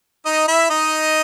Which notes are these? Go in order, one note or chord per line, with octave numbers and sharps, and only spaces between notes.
D#4 D#5
E4 E5
D#4 D#5